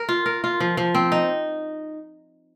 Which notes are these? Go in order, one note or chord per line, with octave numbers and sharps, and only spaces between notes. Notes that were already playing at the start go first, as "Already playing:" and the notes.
Already playing: A#4
F4
A#4
F4
F3
F3
C4
D#4